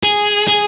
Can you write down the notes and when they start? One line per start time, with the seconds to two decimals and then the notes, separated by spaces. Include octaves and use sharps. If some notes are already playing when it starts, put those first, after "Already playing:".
0.03 G#4
0.48 G#4